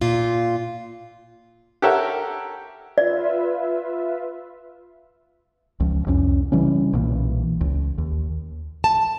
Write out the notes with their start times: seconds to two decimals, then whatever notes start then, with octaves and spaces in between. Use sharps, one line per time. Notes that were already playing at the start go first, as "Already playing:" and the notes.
0.01 A#2 F4
1.82 G4 A4 A#4 C#5 E5 F#5
2.98 F4 B4 D5 E5
5.80 C#2 F3
6.07 C2 F2 C#4
6.52 C#3 E3 G3 C#4
6.93 B1 A#2 E3 A#3
7.61 C#2
7.98 D#2
8.84 A5